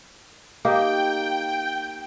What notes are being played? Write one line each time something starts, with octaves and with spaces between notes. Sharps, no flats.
A#3 D#4 G4 G5